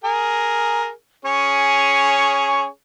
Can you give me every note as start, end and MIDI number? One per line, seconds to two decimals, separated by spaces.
0.04 0.90 68
0.04 0.90 70
1.25 2.67 61
1.25 2.67 68
1.25 2.67 73